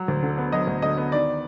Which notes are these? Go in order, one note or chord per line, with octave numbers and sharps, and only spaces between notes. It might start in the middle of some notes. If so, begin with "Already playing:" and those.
Already playing: F#3
D2
D3
B3
F#3 D#5
D2
D3 D#5
B3
D#3 D5